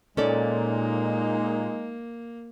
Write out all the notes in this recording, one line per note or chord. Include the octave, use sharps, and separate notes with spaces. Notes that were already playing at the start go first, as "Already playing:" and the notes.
A#2 G#3 A#3 C#4 D#4 A4 D5